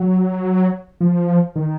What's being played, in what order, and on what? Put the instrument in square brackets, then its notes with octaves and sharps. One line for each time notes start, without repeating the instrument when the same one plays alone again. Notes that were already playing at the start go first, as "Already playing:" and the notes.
Already playing: [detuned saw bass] F#3
F3
D#3